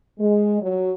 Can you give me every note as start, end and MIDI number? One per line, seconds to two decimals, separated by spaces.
0.19 0.58 56
0.61 0.90 54